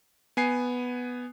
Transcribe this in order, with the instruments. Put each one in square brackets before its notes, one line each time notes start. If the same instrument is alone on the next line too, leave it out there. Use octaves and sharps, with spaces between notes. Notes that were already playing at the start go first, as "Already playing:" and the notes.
[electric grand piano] B3 G#5 C7